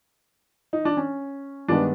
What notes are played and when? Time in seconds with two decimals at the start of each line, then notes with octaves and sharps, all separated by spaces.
0.73 D#4
0.85 D4
0.97 C#4
1.68 G2 D#3 G#3 B3 D4